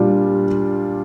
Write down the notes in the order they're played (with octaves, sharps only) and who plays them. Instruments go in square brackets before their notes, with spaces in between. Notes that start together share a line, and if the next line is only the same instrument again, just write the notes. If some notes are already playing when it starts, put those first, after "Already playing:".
Already playing: [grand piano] A#2 G3 D4 F4